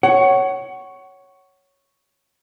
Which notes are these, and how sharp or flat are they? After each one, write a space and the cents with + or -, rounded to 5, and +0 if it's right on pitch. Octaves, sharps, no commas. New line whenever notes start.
C#5 +0 F#5 +25